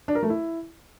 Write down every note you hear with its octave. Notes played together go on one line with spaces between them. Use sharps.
D4
A#4
A3
E4